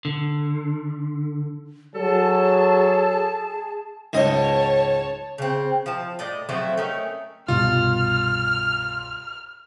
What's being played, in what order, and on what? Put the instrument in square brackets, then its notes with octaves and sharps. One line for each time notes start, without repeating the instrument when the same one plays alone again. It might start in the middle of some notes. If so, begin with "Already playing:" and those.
[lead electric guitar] D3
[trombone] F#3 [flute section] G#4 A5 [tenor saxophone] A4
[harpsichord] C#2 G#2 D#5 [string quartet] C#5 A5
[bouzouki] C#3 C4
F3 A5
A2 D5 D#5
F3 F#3 A3 C4
A3 C#4 D#4 A#4
[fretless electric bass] C2 G2 B2 [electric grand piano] F4 [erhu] F6